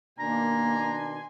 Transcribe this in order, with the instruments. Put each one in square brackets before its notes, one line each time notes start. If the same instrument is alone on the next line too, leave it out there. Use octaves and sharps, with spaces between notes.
[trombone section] B2 D#3 D4 [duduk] A#3 [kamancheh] G#5 C6 [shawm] A#5